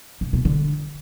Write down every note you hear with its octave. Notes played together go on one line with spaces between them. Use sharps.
C3
B2
D3